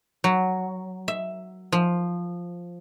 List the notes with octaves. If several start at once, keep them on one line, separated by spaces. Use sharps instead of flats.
F#3
E5
F3